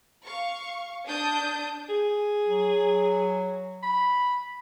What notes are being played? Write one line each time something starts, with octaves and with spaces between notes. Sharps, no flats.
F5 C#6
D4 A5 D#6 G6
G#4
F#3
B5